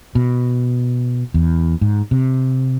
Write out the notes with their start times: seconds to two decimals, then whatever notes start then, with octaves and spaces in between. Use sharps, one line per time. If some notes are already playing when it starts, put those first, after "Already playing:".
0.15 B2
1.34 E2
1.81 G#2
2.11 C3